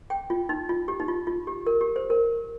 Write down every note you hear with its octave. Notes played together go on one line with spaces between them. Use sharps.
G5
F4
D#4
F4
G4
D#4
F4
F4
G4
A#4
G4
C5
A#4